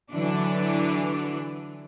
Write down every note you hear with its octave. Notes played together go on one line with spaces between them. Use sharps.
D3 E3 F#3 D4